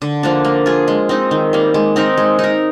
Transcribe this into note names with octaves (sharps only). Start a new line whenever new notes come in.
D3
F3 A#3 D4
A#3
F4 G#4
G#3
C4 D#4
D#3
G3 A#3
G#3
C4 D#4 A#4
G#3
D#4 A#4